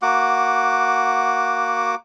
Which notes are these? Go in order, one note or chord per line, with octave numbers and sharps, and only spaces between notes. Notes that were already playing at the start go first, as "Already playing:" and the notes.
A#3 F#4 F#5 D6